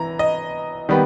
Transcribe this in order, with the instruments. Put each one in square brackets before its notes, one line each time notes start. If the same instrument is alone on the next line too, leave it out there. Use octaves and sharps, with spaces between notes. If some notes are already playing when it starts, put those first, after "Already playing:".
Already playing: [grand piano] E3 A#5
D#5
D#3 G3 B3